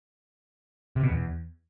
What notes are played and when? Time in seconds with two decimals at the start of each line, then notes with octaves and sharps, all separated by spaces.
0.96 C3
1.03 B2
1.11 E2